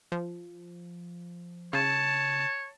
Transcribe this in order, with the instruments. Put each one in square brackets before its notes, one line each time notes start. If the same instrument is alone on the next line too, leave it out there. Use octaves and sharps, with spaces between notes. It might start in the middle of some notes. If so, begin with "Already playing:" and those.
[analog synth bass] F3
[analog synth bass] C#3 [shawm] C#5 [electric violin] A5